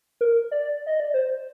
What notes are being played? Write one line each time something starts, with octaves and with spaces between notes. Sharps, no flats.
A#4
D5
D#5
D5
C5